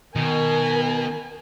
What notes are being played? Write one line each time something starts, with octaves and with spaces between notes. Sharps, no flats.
B2 D#3 A#4 G#5